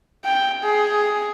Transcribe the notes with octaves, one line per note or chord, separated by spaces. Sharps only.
G5
G#4